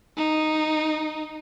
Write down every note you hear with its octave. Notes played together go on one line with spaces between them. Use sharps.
D#4